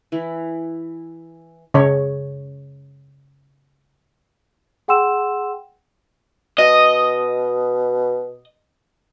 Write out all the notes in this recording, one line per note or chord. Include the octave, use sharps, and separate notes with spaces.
E3 E4
C#3 C#5
G#4 F#5 G5 C6 E6 E7
B2 D#5